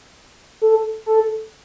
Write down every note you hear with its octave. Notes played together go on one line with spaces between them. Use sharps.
A4
A4